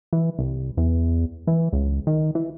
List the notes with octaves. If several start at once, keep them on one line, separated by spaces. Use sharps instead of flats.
E3
C2
E2
E3
C#2
D#3
E3